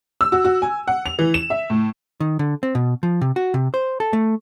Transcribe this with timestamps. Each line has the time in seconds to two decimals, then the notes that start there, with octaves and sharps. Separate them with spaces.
0.21 E6
0.32 F#4
0.45 F#4
0.62 G#5
0.88 F#5
1.06 F7
1.19 E3
1.34 E7
1.50 E5
1.70 A2
2.20 D#3
2.39 D3
2.63 C4
2.75 B2
3.03 F3
3.21 C3
3.36 F#4
3.54 C3
3.74 C5
4.00 A4
4.13 A3